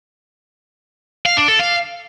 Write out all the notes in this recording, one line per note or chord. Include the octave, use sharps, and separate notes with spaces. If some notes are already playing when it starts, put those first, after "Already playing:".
F5
D4
A4
F5